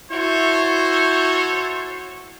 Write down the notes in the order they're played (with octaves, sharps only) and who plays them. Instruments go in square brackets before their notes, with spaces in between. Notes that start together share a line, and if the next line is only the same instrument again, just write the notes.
[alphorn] E4 [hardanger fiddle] F#4 [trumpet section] A4 C5 C#5